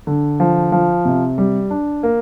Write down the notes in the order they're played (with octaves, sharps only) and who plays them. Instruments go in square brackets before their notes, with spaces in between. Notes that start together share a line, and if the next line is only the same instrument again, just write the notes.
[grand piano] D3
F3
F3
C3
G3
D4
A#3